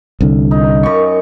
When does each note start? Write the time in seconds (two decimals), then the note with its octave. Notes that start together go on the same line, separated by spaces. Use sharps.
0.21 C2 D3
0.51 D#4
0.83 F#2 C#6